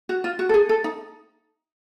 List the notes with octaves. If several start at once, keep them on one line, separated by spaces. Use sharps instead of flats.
F#4
F4
F#4
A4
G#4
A4
D#4